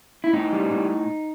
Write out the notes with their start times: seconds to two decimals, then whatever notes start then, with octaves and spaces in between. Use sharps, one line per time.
0.24 E4
0.33 A2 D#4
0.53 G3
0.71 A2